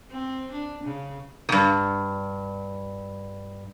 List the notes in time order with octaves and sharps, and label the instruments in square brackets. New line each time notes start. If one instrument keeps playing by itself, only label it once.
[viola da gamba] C4
D4
C#3
[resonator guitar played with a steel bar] E2 G2